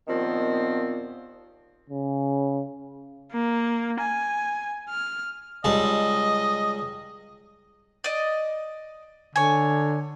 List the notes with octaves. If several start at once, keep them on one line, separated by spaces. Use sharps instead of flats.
D#2 A#2 D#3 F3 B3 C4
C#3
A#3
G#5
F6
C#2 G3 D#5 A5
D5 D#5
D3 C#5 G#5